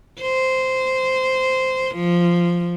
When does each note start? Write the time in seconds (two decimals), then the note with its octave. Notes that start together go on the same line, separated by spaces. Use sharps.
0.20 C5
1.95 F3